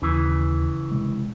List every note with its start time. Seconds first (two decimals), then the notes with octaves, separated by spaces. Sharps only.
0.02 D#2 C#3 E3
0.91 C3 G#3